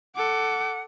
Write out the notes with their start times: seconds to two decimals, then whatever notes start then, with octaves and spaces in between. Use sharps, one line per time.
0.16 A4 F#5 D6